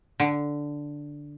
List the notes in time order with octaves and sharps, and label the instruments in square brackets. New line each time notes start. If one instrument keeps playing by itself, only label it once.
[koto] D3